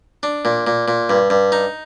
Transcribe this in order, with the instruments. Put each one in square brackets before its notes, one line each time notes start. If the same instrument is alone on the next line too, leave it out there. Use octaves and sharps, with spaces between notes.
[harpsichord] D4
A#2
A#2
A#2
G2
G2
D#4